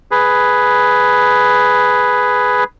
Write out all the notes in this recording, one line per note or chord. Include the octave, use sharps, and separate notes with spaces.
G#4 B4